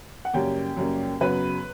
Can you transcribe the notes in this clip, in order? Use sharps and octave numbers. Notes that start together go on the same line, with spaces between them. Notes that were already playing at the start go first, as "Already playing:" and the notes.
F#5
F#2 C#3 G3 A#3 C#4 G4 G5
F#2 C#3 G3 A#3 C#4
F#2 C#3 F#3 B3 B4 B5